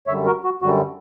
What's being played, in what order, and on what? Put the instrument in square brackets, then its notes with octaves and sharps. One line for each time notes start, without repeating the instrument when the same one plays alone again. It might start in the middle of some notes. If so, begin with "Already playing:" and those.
[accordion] F#2 D3 G3 C#5 E5
F#4 A#4
F#4
F#2 D3 G3 F#4